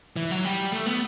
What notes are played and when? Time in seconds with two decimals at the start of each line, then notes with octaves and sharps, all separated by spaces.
0.16 E3
0.31 F#3
0.44 G3
0.72 A3
0.86 B3